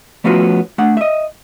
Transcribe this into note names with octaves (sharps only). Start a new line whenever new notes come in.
F3 A3 B3 C#4 F4 F#4
A3 D4 F#5
D#5 E5